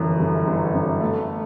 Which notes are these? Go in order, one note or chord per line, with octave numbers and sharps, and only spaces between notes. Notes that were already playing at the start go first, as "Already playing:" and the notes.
Already playing: G1 F#2 E3
G1
G1
F#2
A3